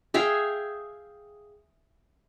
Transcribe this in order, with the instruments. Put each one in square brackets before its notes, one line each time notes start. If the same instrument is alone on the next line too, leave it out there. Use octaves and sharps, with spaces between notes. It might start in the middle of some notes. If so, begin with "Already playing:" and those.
[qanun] G#4 E5 F5 G5